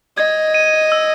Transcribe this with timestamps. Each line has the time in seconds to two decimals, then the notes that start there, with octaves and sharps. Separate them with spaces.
0.17 D#5 G#6
0.54 D#7
0.92 E6